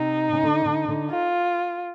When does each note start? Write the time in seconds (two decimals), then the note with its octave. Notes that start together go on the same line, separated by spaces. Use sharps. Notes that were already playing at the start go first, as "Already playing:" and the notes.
Already playing: C3 D#4
0.33 C#3
0.43 D3
0.66 D3
0.88 D3
1.10 F4